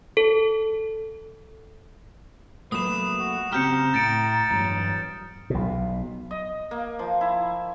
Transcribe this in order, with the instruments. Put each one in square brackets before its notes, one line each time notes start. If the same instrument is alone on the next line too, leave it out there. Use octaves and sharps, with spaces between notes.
[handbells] A4
[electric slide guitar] F#3 A3 A#3 [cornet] B4 [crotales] D#6 E7
[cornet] F#4
[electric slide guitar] C#3 C4 G4 [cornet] A#5 [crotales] F6 G6 C#7
[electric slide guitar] A2 [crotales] A6 C#7 D7
[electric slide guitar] E2 G2 F#3
[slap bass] B1 B2
[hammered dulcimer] D#5
A#3
F3
E4